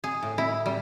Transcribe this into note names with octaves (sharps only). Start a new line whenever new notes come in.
G#4
A2
E4
G3